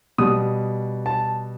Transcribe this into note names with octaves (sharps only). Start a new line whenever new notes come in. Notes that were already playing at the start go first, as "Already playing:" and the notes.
B2 G3 D#6
A5